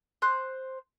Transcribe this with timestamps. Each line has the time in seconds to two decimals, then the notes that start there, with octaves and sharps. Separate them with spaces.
0.22 C5 F#6